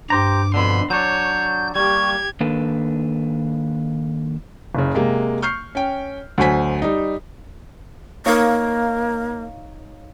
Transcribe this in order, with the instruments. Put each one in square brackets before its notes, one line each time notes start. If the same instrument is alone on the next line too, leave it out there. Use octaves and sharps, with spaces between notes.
[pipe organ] G2 [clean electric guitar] G4 C5 A#5 [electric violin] D6
[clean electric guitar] F2 B2 D3 [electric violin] B5 C6
[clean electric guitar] F#3 D4 [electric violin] C#5 [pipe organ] G6
[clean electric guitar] G3 A#3 [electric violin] G4 G#6 [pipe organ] C#6
[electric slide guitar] D#3 A#3 D4 A4 B4
[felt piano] F#1 C#3
C3 G#3 A#3
C#6 F6 G6 C7
C#4 G5
D2 F#3 C5 G#5 B6
G3 D#4
[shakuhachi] A#3 [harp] D#4 C#5 F5